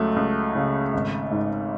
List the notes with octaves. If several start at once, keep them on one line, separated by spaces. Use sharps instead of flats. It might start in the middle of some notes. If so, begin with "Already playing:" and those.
Already playing: C#2 F#3 A3
C#2
C#3
G#1
G#2